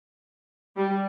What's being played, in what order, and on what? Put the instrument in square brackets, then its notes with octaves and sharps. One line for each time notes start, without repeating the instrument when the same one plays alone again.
[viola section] G3